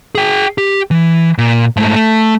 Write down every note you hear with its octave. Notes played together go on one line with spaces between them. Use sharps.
G#4 G5
G4
E3
A#2
G#2 A3
A3